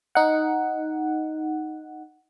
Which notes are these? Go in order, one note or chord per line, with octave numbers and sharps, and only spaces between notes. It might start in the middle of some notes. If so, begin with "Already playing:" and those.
D#4 F#5